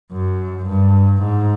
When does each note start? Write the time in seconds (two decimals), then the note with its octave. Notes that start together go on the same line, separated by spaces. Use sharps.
0.12 F#2
0.68 G2
1.23 G#2